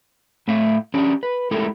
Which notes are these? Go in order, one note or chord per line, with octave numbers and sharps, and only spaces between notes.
A2 A3 E5 F5
C#4 D4 G4
B4
G#3 A3 E4 G4 A4 A#4